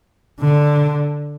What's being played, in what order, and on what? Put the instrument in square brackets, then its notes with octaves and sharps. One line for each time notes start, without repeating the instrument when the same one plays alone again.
[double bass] D3